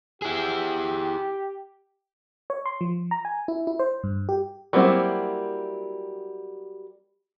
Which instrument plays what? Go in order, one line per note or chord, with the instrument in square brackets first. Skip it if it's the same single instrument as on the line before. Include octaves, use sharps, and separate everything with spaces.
[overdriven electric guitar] E4 G#4 [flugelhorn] G4
[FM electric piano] C#5
C6
F3
A#5
G#5
E4
E4
C5
G2
G4
[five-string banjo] F#3 G3 A#3 C4 E4